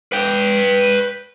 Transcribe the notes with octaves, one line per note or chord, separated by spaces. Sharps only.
B4 G5